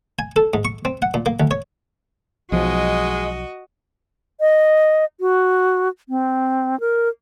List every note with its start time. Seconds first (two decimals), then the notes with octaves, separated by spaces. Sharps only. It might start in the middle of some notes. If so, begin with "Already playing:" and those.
0.19 G#5
0.36 A4
0.54 G#2
0.65 C#6
0.85 C4
1.02 F#5
1.14 A#2
1.26 A#3
1.40 D2
1.51 C#5
2.52 B1 F3 F#3 G#3 F#4 D#5
4.40 D#5
5.20 F#4
6.09 C4
6.80 A#4